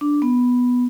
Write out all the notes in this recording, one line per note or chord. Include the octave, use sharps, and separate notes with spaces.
D4
B3